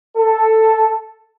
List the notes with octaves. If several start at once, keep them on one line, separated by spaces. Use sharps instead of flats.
A4